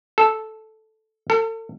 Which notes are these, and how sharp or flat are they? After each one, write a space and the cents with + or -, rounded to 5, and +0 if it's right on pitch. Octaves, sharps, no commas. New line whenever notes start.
A4 -5
A4 +40